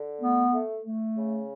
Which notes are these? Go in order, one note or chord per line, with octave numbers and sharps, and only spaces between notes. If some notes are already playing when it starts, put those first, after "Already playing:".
Already playing: D3
A3 B3
A3
A3
C#3